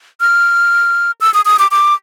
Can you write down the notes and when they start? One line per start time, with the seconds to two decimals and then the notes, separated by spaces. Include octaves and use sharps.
0.20 F6
1.21 E6
1.34 D#6
1.45 D#6
1.59 D6
1.71 D6